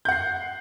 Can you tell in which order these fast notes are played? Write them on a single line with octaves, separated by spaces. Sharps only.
G6 F#5 C7